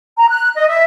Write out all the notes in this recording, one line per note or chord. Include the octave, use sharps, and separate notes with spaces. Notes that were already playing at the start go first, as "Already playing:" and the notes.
A#5
F#6
D#5
E5